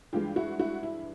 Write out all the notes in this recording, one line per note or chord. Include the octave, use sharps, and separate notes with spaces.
G2 E3 G#3 F4 G4
E4 F#4
E4 F#4
E4